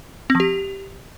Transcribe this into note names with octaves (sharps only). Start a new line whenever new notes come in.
C4
F3
G4